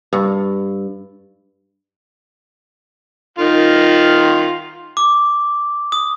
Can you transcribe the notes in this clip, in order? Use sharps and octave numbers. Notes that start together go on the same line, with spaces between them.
G2
D#3 F4
D6
D#6